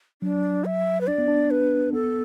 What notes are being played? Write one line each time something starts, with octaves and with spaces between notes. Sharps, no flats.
F#3 D4
E5
B4
D4 D5
B3
D4
B4
B3 A4